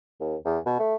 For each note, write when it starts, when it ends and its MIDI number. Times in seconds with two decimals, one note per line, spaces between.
0.20 0.36 39
0.45 0.58 40
0.66 0.75 47
0.79 0.95 57